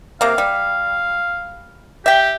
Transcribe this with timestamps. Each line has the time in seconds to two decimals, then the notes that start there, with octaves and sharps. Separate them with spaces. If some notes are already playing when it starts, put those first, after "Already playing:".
0.21 C3 A#3 F5
0.38 G3
2.06 G4 E5 G5